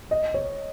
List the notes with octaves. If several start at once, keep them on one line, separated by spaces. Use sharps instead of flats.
D#5
C#5